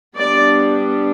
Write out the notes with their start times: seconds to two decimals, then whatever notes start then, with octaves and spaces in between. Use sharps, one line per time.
0.15 G3 B3 D4 D5